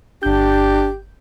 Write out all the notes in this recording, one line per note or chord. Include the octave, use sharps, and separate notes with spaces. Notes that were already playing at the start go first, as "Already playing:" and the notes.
G1 D4 G4 G6